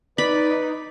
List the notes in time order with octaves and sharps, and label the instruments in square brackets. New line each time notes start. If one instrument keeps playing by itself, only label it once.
[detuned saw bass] D#4 [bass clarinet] B4 [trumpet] D5 [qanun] B5